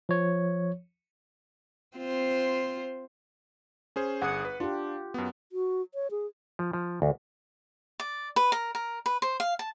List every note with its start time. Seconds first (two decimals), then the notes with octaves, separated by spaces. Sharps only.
0.09 F3 C#5
1.97 C4 F4 C5
3.96 C#4 G#4 C5
4.22 G1 G#4 F#5 D#6
4.45 B4
4.60 D4 F4 G4
5.14 F#2 B3
5.52 F#4
5.94 C#5
6.11 G#4
6.59 F3
6.73 F3
7.02 D2
8.00 D5
8.36 B4
8.52 A#4
8.75 A#4
9.06 B4
9.22 C5
9.40 F5
9.59 A5